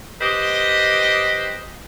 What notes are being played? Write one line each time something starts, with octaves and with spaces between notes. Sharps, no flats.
G4 B4 C5 D#5